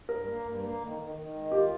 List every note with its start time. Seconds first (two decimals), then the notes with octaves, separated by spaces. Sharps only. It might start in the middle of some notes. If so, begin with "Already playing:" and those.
0.09 G2 A#4
0.26 A#3
0.44 G2
0.62 A#3
0.81 D#3
0.98 D#3
1.15 D#3
1.34 G#3
1.51 F4 G4